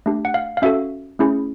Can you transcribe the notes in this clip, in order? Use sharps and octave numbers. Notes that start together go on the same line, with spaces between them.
A3 D4 G4
F#5
F5
F5
C#4 F#4 A4 E5
A3 C#4 E4 G#4